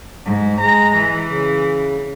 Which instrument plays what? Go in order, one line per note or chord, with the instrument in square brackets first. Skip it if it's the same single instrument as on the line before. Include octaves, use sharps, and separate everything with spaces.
[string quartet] G#2
[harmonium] G#3 [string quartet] A#5
[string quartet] E3
[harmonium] C#3